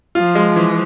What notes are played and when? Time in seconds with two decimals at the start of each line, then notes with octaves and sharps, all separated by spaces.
0.15 F3 F4
0.35 G#3
0.56 E3